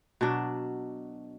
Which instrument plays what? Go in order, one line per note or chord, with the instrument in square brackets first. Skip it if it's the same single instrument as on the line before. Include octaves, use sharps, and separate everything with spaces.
[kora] B2 F#3 D4